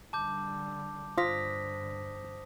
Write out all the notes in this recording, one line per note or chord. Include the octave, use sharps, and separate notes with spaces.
D3 G3 A5 D6 G6
G2 D3 F4 C5 D#6 A#6 B6